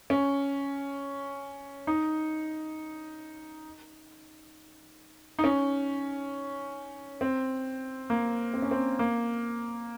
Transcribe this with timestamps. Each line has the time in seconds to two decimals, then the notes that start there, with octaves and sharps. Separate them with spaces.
0.10 C#4
1.87 D#4
5.39 D#4
5.44 C#4
7.21 C4
8.10 A#3
8.54 C4
8.62 C#4
8.71 C4
8.99 A#3